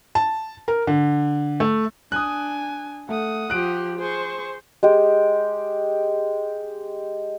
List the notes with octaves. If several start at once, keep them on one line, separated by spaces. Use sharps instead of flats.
A5
A#4
D3
A3
D4 G#5 D#6 F#6
A3 F#5 D#6
F3 G4 F#6 D7
G#4 C5 C#6
G#3 G4